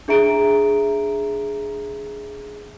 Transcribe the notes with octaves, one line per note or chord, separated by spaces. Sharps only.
D4 G#4 E5 A#5 D7